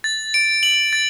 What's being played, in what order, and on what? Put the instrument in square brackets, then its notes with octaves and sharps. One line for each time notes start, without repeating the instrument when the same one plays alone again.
[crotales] A6
D7
F#7
A6